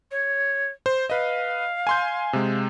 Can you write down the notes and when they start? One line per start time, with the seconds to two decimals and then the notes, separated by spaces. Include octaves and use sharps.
0.11 C#5
0.86 C5
1.10 B4 D#5 F5
1.87 G#5 C6 G6
2.33 C3 G#3